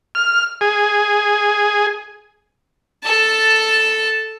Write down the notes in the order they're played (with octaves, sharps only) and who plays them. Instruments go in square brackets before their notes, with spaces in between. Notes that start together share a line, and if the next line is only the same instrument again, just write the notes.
[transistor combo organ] F6
G#4
[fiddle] A4 A5